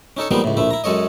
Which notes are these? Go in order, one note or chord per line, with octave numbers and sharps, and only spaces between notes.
C#4 D#4 A4 C#5
F3 G3 G#3 A#3 B3 D#4
C#2 A2
A#1 A3 E4
E4 A#5
F#2 G#3 A4 C#5 D#5